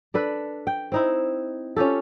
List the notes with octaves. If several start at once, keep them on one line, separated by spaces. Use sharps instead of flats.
D4 A4 B4
G5
C4 D#4 E4
C#4 F4 G4 A4